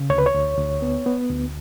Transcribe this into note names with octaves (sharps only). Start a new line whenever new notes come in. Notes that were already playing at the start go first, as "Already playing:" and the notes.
Already playing: C#3
D2 C#5
B4
C#5
D2
D2
B3
B3
D2